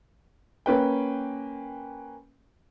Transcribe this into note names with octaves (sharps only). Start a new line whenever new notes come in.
A#3 C#4 B4 G5